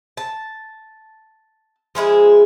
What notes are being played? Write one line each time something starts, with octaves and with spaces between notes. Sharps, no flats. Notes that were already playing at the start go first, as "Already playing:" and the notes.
A5
F3 G#3 E4 G#4